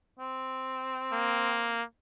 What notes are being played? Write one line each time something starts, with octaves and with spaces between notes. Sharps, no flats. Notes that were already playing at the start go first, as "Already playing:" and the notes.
C4
A#3